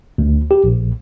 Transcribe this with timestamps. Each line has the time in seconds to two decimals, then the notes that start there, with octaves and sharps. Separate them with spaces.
0.18 D2
0.51 G4
0.64 A#1